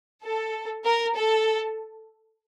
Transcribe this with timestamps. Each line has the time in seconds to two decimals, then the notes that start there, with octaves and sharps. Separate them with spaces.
0.24 A4
0.85 A#4
1.14 A4